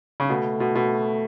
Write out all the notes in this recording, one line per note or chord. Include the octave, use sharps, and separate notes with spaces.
C#3
B2 A3
B2
B2